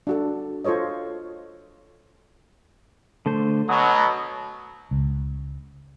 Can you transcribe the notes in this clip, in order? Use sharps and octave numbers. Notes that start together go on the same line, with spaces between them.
D4 F#4 A4
F4 A4 C5 C#5 D#5
D3 A3 C5
B2 F#3 D#6
C#2